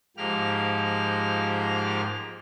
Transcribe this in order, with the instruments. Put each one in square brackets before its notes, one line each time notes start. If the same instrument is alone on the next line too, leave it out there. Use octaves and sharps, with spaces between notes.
[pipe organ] G#2 F3 A#3 G4 F6